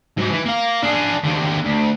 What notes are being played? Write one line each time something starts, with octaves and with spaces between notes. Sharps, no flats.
G#2 F#3
E3
A#3 F5
D4 G#4
D#2 D3
D2